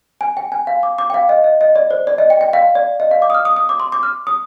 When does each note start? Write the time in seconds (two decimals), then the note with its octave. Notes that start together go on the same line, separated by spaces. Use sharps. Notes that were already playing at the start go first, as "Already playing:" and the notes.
0.21 G#5
0.37 G5
0.52 G#5
0.67 F5
0.83 D6
0.98 D6
1.10 G5
1.14 F5
1.29 D#5
1.44 D#5
1.61 D#5
1.76 D5
1.91 C5
2.07 D5
2.18 D#5
2.30 G5
2.41 G5
2.53 F5
2.75 D5
3.00 D#5
3.11 F5
3.22 D6
3.30 D#6
3.34 F6
3.45 D#6
3.56 D#6
3.69 D6
3.80 C6
3.92 D6
4.03 F6
4.27 D#6